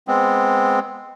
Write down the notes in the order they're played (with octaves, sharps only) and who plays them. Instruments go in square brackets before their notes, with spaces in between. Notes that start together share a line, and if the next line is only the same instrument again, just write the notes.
[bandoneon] G#3 B3 C4